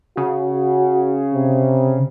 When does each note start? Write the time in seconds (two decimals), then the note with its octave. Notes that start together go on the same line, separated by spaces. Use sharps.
0.17 C#3 F#4
1.34 C3